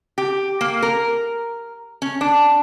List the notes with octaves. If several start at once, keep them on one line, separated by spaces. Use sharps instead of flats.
G4
A#3
A#4
C#4
D4